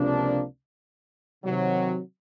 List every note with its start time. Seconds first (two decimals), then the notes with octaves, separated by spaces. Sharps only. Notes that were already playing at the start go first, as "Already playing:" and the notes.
Already playing: C#2 C3 F3 A#3 D4
1.44 C3 D#3 F#3